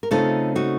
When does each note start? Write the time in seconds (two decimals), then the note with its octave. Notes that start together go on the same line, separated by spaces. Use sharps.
0.03 A#4
0.11 C#3 A3 C4 D#4 F4 A4
0.55 D#4 F#4